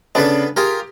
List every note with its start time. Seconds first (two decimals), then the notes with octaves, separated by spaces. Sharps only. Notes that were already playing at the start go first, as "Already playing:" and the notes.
0.15 C#3 B3 D4 A4 B4
0.57 F4 G4 G#4 A#4